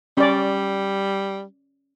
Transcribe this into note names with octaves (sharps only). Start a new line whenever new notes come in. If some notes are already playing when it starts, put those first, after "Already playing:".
G3 C#4 D5